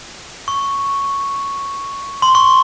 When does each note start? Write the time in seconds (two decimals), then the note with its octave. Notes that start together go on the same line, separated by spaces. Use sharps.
0.48 C#6
2.22 C6
2.35 C#6